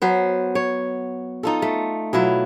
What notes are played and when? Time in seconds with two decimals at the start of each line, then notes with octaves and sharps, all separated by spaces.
0.02 F#3 B3 C5
0.55 C#5
1.43 D#4 F4 A4
1.62 A3
2.13 B2 F#3 E4 F4